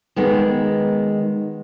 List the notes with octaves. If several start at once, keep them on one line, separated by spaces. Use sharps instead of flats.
D#3 G#3 B3 A#4